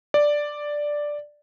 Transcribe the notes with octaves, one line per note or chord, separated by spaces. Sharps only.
D5